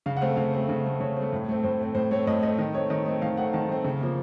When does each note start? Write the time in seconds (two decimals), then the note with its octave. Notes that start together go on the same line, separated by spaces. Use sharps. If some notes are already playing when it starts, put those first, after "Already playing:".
0.06 C#3 F5
0.17 F#5
0.21 A3 C4 F5
0.37 C#3 F5
0.54 A3 C4
0.69 C#3
0.84 A3 C4
1.00 C#3 C#5
1.17 A3 C4
1.33 A2
1.48 A3 C4
1.64 A2 C5
1.79 A3 C4
1.95 A2 C5
2.11 A3 C4 C#5
2.27 A2 D#5
2.43 A3 C4 D#5
2.59 D#3 D#5
2.74 A3 C4 C#5
2.90 D#3 D#5
3.06 A3 C4
3.22 D#3 F5
3.37 A3 C4 F#5
3.53 D#3 A5
3.69 A3 C4
3.84 C#3
4.01 F3 A#3